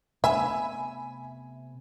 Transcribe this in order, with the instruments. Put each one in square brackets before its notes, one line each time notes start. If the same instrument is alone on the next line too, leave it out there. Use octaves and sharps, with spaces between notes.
[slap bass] C3 A3 B3 [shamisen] E5 [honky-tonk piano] G#5 B5